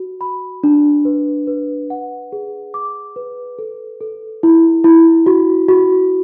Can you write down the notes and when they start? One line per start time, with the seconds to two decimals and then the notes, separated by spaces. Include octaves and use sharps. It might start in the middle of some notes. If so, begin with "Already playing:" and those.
Already playing: F#4
0.21 B5
0.64 D4
1.05 B4
1.47 B4
1.90 F#5
2.32 G#4
2.74 D6
3.16 B4
3.59 A4
4.01 A4
4.43 E4
4.84 E4
5.26 F#4
5.69 F#4